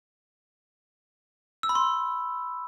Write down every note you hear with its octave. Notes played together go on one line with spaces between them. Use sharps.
E6
B5
C6